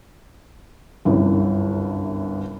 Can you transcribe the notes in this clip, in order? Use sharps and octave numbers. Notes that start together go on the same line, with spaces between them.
G1 C2 F#2